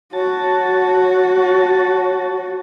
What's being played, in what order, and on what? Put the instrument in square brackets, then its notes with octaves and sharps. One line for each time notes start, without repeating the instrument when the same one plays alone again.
[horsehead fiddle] F#4 [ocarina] C#5 [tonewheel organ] A5